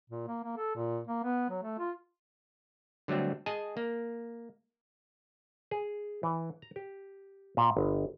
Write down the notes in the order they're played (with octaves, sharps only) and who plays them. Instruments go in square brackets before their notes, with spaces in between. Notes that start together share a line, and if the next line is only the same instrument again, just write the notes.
[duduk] A#2
A#3
A#3
A4
A#2
A#3
B3
F#3
A3
F4
[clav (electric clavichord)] D3 F#3 G3 A3 C4
G#4 D#5 G#5 A5
A#3
G#4
E3
A#5
G4
A#2
G1